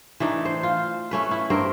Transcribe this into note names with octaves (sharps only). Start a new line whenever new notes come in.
E3 A3 D4 D#4
C5
F4
A3 C#4 B4
E4
G2 C4 A#4